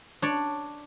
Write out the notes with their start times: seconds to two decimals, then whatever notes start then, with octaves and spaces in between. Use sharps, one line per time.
0.22 D4 C#5 D5